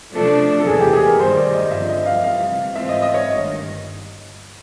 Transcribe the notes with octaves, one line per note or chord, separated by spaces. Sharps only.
C3 F3 A3 D4 A4
A4
E2 C3 E3 G#3 G#4
G4
G#4
A#4
G1 G2 D#3 G3 C5
D5
D#5
G1 F2 D3 F3 E5
D#5
F5
C3 E3 G3 F5
G#2 E3 G#3 C4 F4 E5
D#5
D#5
C#5
G1 G2 D#3